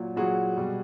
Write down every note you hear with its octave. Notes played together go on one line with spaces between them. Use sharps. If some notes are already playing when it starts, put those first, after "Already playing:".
Already playing: A#2 F#3
A#2 F#3 F#4 G#4
B2 G3